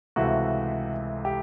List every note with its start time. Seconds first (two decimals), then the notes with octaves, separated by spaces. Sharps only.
0.16 C#2 C3 E3 A3 F#4
1.25 G4